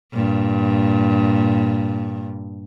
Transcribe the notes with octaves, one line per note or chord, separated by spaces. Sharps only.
G2 A#2